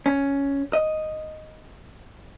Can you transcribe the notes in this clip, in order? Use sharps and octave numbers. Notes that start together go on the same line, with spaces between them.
C#4
D#5